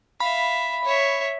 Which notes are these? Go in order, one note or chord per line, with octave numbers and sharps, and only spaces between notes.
E5 F5 B5
C#5 E5